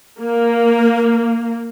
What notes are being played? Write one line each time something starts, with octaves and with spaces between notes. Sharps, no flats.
A#3 A#4